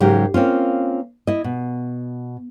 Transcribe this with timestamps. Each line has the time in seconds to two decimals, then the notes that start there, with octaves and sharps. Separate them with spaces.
0.01 G#2 C#3 F#3 G#3 G4 A#4
0.34 A#3 C4 C#4 F4
1.27 E4 D#5
1.44 B2